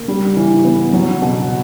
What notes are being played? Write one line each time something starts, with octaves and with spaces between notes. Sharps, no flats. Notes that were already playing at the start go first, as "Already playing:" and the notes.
Already playing: A#3
G3
E3
B3
F#3
B2